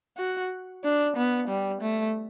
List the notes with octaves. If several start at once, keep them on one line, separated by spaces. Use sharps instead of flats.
F#4
D4
B3
G3
A3